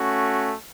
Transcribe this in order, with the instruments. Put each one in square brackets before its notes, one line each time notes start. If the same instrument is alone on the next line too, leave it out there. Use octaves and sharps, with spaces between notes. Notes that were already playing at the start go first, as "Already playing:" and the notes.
Already playing: [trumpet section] A3 C#4 F#4